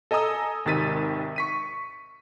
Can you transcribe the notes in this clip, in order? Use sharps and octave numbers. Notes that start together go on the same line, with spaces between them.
A4 D#5 G#5 A#5 D#6 E6
G#1 C3 D#3 A6 B6 D#7
C#6 B6 D#7